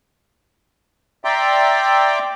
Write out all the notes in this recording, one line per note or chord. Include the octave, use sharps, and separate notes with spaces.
D5 E5 G5 A#5 C6 D6